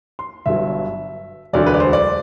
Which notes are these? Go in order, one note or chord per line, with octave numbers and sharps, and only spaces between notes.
C6
G1 G2 F#3 E5
E1 D2 D3 F#3 D5
B4
D5
C5
D5